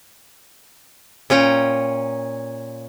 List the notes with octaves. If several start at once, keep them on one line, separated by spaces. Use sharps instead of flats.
A#2 C#4 G5 A#5